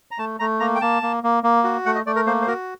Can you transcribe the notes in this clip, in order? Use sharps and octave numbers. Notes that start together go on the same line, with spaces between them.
A#5
A3 A5
A3 A#5
A#3 A#5
G5
A#3 A5
A#3
A#3
A#3
F#4
A3 F#5
D#5
A3 D5
A#4
A#3 C5
C5
F#4 A#4